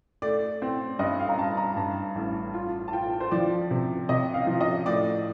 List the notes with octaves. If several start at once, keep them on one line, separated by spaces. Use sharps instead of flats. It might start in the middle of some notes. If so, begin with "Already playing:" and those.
A3 D5
C4
G2 D#5
F5
A#5
G2 A5
A#5
G2 A5
A1
F4
A5
F4 G5
C5
F3 D5
C3
C3 D#5
F5
F3
D#5
A2 D5